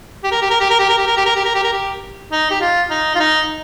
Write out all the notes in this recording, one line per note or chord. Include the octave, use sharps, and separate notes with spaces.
G4
A#4
G4
A#4
G4
A#4
G4
A#4
G4
A#4
G4
A#4
G4
A#4
G4
A#4
G4
D#4
G4
F4
D#4
F4
D#4